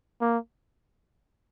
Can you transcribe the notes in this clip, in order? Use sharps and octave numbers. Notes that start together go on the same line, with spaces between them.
A#3